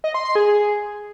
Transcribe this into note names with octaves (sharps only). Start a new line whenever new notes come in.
D#5
C6
C6
G#4